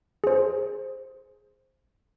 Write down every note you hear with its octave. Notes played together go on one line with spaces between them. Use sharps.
G#4 C5